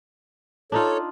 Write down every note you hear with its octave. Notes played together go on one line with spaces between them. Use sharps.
D4 D#4 F4 A4 C#5